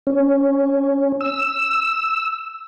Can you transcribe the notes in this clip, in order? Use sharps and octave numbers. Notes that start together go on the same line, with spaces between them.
C#4
E6